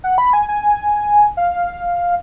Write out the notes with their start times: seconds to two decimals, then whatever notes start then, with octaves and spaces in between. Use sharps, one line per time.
0.04 F#5
0.18 B5
0.33 G#5
0.48 G#5
1.37 F5